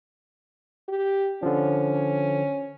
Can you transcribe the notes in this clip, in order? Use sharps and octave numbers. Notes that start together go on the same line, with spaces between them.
G4
D3 F3 C#4